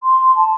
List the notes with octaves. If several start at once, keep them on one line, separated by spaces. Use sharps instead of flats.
C6
A5